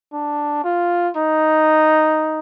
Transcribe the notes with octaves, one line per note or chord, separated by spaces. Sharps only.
D4
F4
D#4